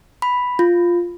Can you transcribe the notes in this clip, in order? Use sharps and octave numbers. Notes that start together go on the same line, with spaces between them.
B5
F4